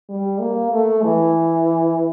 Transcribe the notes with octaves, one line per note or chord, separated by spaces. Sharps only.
G3
A#3
A3
E3